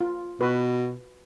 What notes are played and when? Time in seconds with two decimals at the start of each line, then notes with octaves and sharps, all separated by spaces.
0.01 F4
0.41 B2 F#4 B4